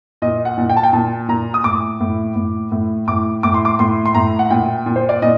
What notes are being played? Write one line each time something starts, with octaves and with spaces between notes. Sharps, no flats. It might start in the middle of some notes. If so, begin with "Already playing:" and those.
A#2 D#5
F#5
A#2
G5
A5
G5
A#2 A5
A#2 A#5
D#6
A2 D6
A2
A2
A2
A2 D6
A2 D6
C6
D6
A2 C6
C6
A2 A#5
F#5
A#2 G5
A#2
C5
D5
A#2 D#5